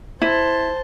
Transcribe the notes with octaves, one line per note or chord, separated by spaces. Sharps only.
E4 C5 A5